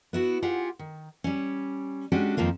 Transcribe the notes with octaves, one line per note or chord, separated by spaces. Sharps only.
B3 E4 F#4
F4 G4 G#4 F#5
D#3
G3 C#4
G#3 C#4 D4 F#4 G4
F2 D#3 F3 A#3 F4